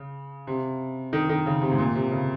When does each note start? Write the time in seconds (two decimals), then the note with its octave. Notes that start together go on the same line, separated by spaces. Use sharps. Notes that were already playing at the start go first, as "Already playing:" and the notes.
Already playing: C#3
0.47 C3
1.13 D#3
1.29 D#3
1.46 C#3
1.62 C3
1.71 G#2
1.78 A#2
1.95 C3
2.11 C#3